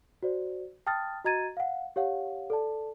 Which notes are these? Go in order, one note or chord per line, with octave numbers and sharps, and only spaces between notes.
F#4 C5 D5
G5 A5 D#6 F6 A6
F#4 D#5 A#5 G#6 A6 D#7
F5 F#5
G4 C#5 F5 F#5
A4 D5 A5